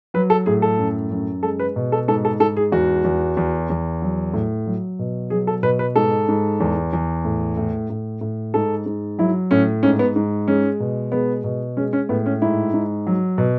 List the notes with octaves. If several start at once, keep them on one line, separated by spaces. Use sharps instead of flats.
F#3 B4
A4
A2 G#4
A4
F#2
F#2
G#3 A4
B4
B2
A4
G#2 A4
A4
G#2 A4
G#4
E2 F#4
E2
E2
E2
F#3
A2
F#3
B2
F#3 G#4
A4
B2 B4
B4
G#2 A4
G#2
E2
E2
A2
A2
A2
A2
G#2 A4
G#2
F#3 E4
A2 C#4
G#2 C#4
B3
G#2
G#3 C#4
B2
G#3 B3
B2
G#3 C#4
C#4
A2 B3
C#4
G#2 E4
G#2
F#3
B2